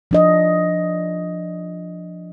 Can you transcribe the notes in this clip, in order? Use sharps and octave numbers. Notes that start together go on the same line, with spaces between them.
F3 D4 D#5